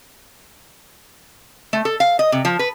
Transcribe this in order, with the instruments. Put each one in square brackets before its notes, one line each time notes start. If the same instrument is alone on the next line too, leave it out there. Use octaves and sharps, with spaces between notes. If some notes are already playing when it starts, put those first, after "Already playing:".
[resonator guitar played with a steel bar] A3
A4
F5
D#5
C3
F3
B4